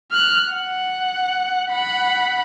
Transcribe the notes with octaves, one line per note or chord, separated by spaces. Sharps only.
F6 F#6
F#5
F#5 B5